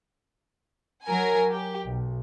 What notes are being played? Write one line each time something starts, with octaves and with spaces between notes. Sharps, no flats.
F#3 A#4 G#5
G4
B1